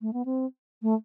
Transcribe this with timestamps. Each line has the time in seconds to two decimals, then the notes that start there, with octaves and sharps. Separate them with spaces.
0.01 A3
0.13 B3
0.25 C4
0.82 A3